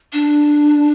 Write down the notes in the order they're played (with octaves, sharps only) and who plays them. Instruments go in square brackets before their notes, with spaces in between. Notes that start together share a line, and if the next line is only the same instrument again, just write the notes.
[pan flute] D4